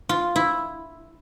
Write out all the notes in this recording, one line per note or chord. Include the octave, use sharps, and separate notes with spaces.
F4
E4